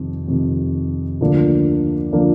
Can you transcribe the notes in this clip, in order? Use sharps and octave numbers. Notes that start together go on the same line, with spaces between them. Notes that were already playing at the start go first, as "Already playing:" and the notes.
Already playing: F2 C3 D#3
F2 C3 D#3
D2 D3 F3 A#3 D4
D3 F3 A#3 D4